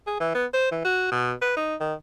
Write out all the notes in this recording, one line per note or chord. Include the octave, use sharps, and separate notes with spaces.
G#4
E3
B3
C5
E3
F#4
B2
B4
D#4
D#3